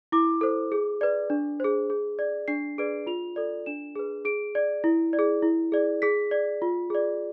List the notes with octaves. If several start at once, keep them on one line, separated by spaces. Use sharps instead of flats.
E4 D6
A4 C5
G#4
B4 D5
D4
G#4 C5
G#4
D5
D4 C7
G#4 B4 D5 D7
F4 F7
A4 D5
D4 E7
G#4 B4
G#4 D7
D5
E4
D5
G#4
E4
G#4 D5
G#4 B6
D5
F4
G#4 D5